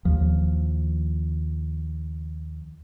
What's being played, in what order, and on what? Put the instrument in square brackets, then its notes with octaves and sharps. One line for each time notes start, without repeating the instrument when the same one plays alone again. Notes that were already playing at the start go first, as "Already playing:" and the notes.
[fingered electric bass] D#2 F3